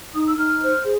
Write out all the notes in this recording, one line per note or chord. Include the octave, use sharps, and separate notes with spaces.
D#4 D#6
E6
D#4 F6
C5
G#4